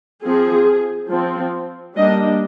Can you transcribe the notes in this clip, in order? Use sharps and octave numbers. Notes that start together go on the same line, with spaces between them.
F3 C4 G#4
F3 C4
G3 A#3 D4 D#5